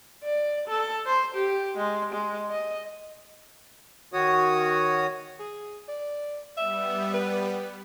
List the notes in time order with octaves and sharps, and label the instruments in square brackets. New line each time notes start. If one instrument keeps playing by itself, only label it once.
[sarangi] D5
A4
C5
G4
G#3
G#3
D#5
[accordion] D#3 F#4 C#5 D#6
[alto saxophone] G#4
D5
[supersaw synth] G3 B3 [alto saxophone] E5
[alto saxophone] B4